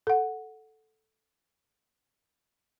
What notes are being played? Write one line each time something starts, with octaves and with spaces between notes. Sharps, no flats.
A4 F#5